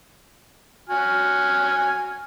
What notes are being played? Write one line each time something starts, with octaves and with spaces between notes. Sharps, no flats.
F#4 G#5 F6